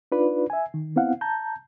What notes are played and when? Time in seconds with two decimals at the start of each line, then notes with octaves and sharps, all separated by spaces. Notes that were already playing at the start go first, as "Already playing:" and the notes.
0.12 D4 D#4 F4 B4 D5
0.50 E5 G#5
0.74 D#3
0.96 B3 C4 E4 F5 F#5
1.21 A5 A#5 G6